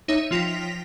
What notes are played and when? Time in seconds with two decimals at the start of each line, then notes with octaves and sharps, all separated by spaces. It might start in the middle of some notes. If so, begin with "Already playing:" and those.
0.08 D#4 C#5 E5
0.31 F3 F4 G5 A#6 B6